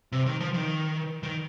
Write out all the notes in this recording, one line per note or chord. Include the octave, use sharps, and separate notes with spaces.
C3
D#3
F3
D#3
D#3